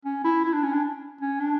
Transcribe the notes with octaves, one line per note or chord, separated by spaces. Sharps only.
C#4
E4
E4
D4
C#4
D4
C#4
D4